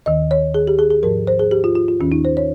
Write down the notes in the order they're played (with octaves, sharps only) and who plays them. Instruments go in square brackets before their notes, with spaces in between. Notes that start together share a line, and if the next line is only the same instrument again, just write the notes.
[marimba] D#2 D#3 D#5
C#5
G#4
G4
G#4
G#4
G#2 F3 A#4
C5
G#4
G4
F4
F4
F4
D#2 D#3 C#4
D#4
C5
C#5